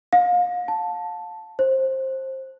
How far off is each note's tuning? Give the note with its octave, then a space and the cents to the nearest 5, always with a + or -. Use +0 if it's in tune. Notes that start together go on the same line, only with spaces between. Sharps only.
F5 +35
A5 +0
C5 +20